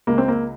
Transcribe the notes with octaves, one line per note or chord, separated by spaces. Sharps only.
C#2 A#3
C4
A#3